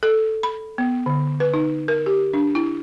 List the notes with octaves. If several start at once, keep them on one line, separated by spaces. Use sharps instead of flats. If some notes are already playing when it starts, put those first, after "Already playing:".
A4
B5
B3
D3
B4
D#4
A#4
G4
D4
E4